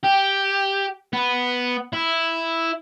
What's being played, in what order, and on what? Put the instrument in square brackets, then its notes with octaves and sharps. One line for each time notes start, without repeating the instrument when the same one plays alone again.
[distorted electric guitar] G4
B3
E4